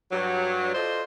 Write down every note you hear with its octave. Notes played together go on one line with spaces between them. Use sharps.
G2 F#3
F4 A4 C5 D5 D#5